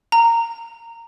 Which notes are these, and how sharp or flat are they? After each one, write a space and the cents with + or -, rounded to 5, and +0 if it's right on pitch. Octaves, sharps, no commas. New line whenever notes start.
A#5 -15